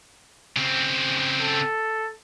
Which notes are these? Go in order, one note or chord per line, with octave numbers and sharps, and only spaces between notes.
C#3 C4
A4